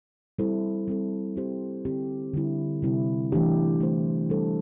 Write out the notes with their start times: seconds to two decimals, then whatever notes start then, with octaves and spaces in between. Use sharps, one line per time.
0.39 G3 C4 E4 A4 C5
0.88 G3 C4 A4
1.36 G3 C4 G4 C5
1.85 D3 C4 G4
2.34 D3 G3 E4
2.82 C3 G3 C4 E4
3.32 E3 A3 D4 G4
3.80 A3 E4 G4 C5
4.30 G3 D4 A4 C5